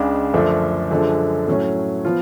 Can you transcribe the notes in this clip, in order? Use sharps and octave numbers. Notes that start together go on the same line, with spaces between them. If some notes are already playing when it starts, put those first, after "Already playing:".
Already playing: C#2 C#3 G#3 D4
F#2 D3 F3 A3 D4
F#2 D3 F3 G#3 D4
A2 F#3 A3 C#4
F3 B3 F4